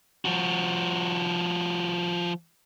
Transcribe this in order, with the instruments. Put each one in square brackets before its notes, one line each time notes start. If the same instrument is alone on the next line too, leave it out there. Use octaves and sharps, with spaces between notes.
[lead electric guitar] F3 F#4